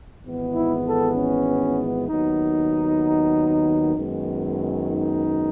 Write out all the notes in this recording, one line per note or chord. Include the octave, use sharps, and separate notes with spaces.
G#1 G#2 E3 G#3 B3
E4
A4
C#4
D#2 D#3 F#3 B3 D#4
F#2 D#3 G#3 B3
D#4